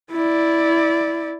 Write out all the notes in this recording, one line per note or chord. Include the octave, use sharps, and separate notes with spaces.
E4 D5